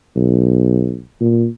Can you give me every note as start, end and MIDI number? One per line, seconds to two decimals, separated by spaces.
0.16 1.00 35
1.21 1.47 46